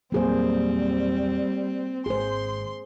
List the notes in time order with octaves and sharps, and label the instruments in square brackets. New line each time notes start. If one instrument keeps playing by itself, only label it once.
[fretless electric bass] E2 A#2 F#3 [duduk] G3 [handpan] A#3 G#4 C5 [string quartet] C4
[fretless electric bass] G#1 [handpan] G#4 C5 [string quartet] C6